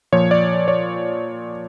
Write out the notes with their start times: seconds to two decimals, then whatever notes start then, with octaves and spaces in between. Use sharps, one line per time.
0.12 A#2 F3 C#5
0.31 D5
0.68 C#5